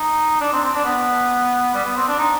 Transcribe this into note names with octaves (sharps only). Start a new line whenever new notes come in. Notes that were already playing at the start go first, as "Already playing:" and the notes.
Already playing: D#4
D4
C4
C4
D4
B3
G3
B3
C4
D4
D#4